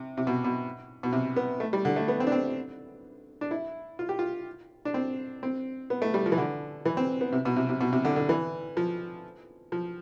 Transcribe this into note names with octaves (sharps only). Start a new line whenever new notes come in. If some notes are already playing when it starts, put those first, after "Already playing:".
Already playing: C3
C3
B2
B2
B2
C3
B3
A3
G3
D3
A3
B3
C4
D4
C4
D4
E4
F4
G4
F4
D4
C4
C4
B3
A3
G3
F3
E3
D3
E3
C4
B3
C3
B2
C3
C3
B2
C3
D3
D3
E3
F3
F3